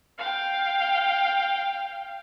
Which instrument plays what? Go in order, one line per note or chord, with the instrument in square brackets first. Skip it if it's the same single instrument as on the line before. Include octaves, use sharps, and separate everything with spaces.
[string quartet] F5 G5